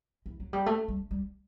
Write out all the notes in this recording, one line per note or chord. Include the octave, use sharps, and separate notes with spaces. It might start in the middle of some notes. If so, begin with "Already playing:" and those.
E3
F#3
G3
A3
G3
G3